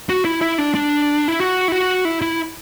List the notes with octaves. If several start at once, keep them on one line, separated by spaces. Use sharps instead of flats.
F#4
E4
E4
D4
D4
E4
F#4
E4
F#4
E4
E4